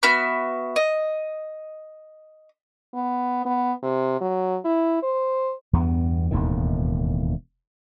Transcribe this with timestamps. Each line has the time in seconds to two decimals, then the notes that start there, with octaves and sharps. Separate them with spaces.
0.03 B3 F#4 E5 F6
0.76 D#5
2.94 B3
3.45 B3
3.83 C3
4.21 F#3
4.65 E4
5.03 C5
5.73 E2 G2 B3
6.31 E1 D#2 A2 D#3